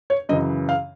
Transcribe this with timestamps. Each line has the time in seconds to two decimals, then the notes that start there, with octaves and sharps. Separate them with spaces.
0.10 C#5
0.29 F#2 C#3 E3 D#5
0.69 F5